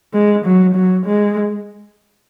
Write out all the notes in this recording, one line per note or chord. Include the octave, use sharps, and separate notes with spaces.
G#3
F#3
F#3
G#3